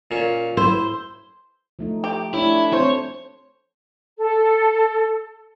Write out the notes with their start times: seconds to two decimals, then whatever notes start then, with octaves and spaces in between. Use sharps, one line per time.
0.11 A#2 C#4
0.57 E4 C5
1.79 F3 A3 D#4
2.04 G4
2.34 A3 D4 E4 C#5
2.73 C4 C5 C#5
4.18 A4